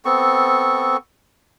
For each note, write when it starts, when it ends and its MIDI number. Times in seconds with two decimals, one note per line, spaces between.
0.05 0.97 59
0.05 0.97 60
0.05 0.97 69
0.05 0.97 85